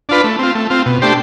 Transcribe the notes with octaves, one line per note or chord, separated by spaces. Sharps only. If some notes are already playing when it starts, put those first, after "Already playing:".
D4 F4 B4
A3
C4 F4
A3
C4 F4
B2
A3 D4 G4 C5